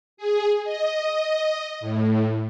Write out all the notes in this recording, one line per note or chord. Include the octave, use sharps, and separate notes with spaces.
G#4
D#5
A2